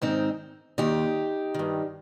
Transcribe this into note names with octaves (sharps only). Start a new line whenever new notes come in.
G#2 D#3 C4 D#4
D#2 D#3 D#4 G4
G2 D#3